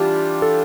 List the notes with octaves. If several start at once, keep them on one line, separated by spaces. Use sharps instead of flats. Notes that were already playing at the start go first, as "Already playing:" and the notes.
Already playing: E3 G3 D4 F4 G4
A4